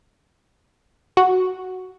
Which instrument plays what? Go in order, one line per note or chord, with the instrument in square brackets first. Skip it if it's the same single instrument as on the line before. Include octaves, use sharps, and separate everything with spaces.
[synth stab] F#4